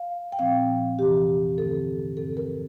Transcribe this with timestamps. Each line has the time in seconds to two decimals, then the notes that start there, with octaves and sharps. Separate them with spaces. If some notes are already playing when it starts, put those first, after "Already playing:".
Already playing: F5
0.32 G5
0.39 A#2 F3 C4 F5
0.99 E2 C3 E3 G4
1.58 G2 D3 A3 C4 A4
2.17 G2 D3 F3 C4 A4
2.37 A#4